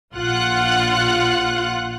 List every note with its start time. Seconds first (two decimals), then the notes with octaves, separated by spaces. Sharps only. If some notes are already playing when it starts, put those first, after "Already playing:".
0.15 A#1 F4 F#5 F#6